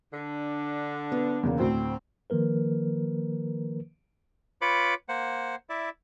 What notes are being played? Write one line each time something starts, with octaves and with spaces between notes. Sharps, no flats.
D3 D4
B3
E2 C#3 A#3
D2 A2 C4
D#3 F3 A#3 A#4 B4
F4 B4 C#5 B5 D6
A#3 C5 F#5
E4 D5 E5